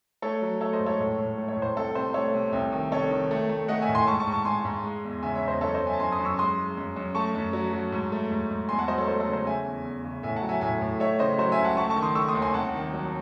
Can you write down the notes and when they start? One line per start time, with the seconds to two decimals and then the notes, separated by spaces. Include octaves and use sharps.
0.22 A3 A4 C#5
0.42 F#3
0.60 A3 A4 C#5
0.73 C5 D#5
0.79 G#2
0.86 A4 C#5
1.00 A2
1.18 A2
1.38 A3
1.48 C#5
1.57 A2
1.62 C5
1.76 C2 A4
1.95 C3 C5
2.14 A3 A4 C#5
2.34 C3
2.53 C2
2.72 D#3
2.92 C3 A4 C#5
3.10 D#3
3.31 A3
3.49 A3
3.68 A3 D#5 F#5
3.81 E5 G#5
3.89 A2
3.95 G#5 C6
4.07 G#2 A5 C#6
4.20 A5 C#6
4.27 G#2
4.32 A5 C#6
4.45 G#2 G#5 C6
4.65 G#2
4.84 G#3
5.04 E2
5.23 C#3 E5 G#5
5.35 C#5 E5
5.42 E2
5.48 C5 D#5
5.61 F#2 A4 C#5
5.74 C5 D#5
5.80 F#2
5.86 E5 G#5
5.93 A5
6.00 F#2 G#5 C6
6.12 C6 D#6
6.19 F#2
6.25 C#6 E6
6.39 G#3 C6 D#6
6.58 G#3
6.77 F#2
6.96 F#2
7.15 A3 A5 C#6
7.35 F#2
7.53 F#3
7.73 F#3
7.92 G#2
8.12 A3
8.31 G#2
8.50 G#2
8.69 E2 G#5 C6
8.79 F#5 A5
8.88 F#3 C5 D#5
8.98 A4 C#5
9.07 A3 C5
9.20 A4
9.27 C#3
9.33 C5
9.46 C#3 E5 G#5
9.65 E2
9.85 E2
10.05 C#3
10.23 A2 E5 G#5
10.36 F#5 A5
10.43 F#3
10.49 E5 G#5
10.61 A2 E5 G#5
10.81 A2
11.00 A3 C#5 E5
11.19 C#3 C5 D#5
11.38 F#3 C5
11.52 E5 G#5
11.58 C#2
11.64 F#5 A5
11.77 A3 A5 C#6
11.90 A5 C#6
11.96 D#3
12.02 C6 D#6
12.15 A3 C#6 E6
12.28 C6 D#6
12.35 D#2
12.42 G#5 C6
12.54 C2 F#5 A5
12.74 D#3
12.93 F#3